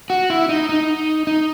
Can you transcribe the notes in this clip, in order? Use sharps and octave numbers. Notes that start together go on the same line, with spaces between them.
F#4
E4
D#4
D#4
D#4